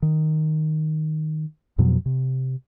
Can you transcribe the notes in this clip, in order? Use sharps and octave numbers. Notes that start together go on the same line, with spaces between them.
D#3
F2 B2 F3 F#3
C3